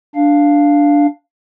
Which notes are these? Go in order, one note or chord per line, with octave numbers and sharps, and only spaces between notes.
D4 F5